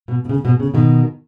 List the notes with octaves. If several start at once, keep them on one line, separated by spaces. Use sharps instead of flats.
B2
B2
C#3
B2
C#3
B2 D#3